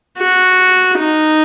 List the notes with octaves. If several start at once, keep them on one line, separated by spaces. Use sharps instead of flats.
F#4
D#4